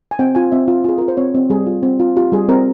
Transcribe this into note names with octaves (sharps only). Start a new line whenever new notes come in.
G#5
C4 G5
F4 G#5
C4 E5
F4
F4 G#4
F4 A#4
C5
C4 C#5
C4
G3 G#4
F4
C4
F4
F4 G4
G3 G#4
C4 A#4